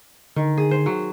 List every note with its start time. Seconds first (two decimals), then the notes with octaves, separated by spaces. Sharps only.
0.36 D3 D#3
0.57 G#4
0.71 C5
0.86 F#3